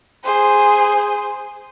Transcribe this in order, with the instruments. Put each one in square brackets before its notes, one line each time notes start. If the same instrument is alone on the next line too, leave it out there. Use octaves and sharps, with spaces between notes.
[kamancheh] G#4 C5